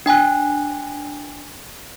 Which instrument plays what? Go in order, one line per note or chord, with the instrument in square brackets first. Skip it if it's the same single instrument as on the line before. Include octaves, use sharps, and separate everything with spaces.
[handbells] D4 G5 G#5 F#6